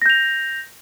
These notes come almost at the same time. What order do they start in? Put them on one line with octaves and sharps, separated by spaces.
A#6 G6 F7